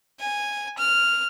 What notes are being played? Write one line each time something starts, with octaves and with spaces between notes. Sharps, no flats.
G#5
F6